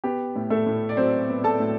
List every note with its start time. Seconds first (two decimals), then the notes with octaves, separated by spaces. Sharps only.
0.04 B3 G4
0.35 A2
0.50 A3 A4
0.66 A2
0.89 D5
0.97 F#3 C4 C5
1.29 B3
1.44 A4 A5
1.60 A2